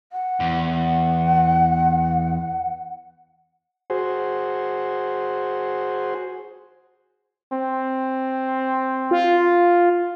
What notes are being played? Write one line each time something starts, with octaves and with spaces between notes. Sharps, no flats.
F#5
E2
F#4 G#4 C5
C4
F4